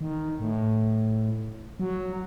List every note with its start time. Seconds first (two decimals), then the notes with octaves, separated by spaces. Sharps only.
0.01 D#3
0.40 A2
1.79 F#3